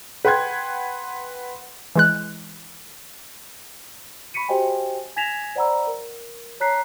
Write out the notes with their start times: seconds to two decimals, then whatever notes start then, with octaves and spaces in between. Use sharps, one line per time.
0.25 B4 F#5 G5 C6 F#6 G#6
1.96 E3 G#3 F#6
4.34 B5 C#6 B6 C#7 D#7
4.48 F#4 G4 C5 D#5 G5 G#5
5.16 G#5 G#6 A#6 B6 E7 F7
5.55 C5 D5 F#5 A#5 B5 E6
5.87 A#4
6.60 C#5 A5 A#5 F#6 B6 C7